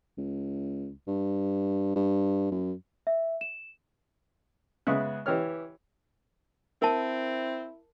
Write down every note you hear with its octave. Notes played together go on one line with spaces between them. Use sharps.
C#2
G2
G2
F#2
E5
E7
C#3 G#3 B3 E5 F#6
E3 G4 C#5 F6
C4 E4 A#4 A5